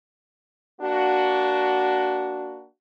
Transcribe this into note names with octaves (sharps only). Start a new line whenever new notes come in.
A#3 D4 F#4